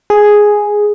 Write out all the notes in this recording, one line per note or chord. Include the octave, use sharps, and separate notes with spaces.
G#4